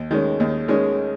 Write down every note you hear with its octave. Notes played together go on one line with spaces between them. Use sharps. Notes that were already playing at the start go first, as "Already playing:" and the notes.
Already playing: D#2
D#3 G#3 C#4
D#2
D#3 G#3 C#4